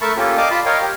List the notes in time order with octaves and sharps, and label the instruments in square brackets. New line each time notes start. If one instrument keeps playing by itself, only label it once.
[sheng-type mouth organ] A3 A#4 E5 A5 B5 C#6
A#3 C#4 F4 G4 A4
D5 D#5 F5 A5 D6 D#6
F4 A5 B5
A#4 C#5 D#5 F5 G5
G4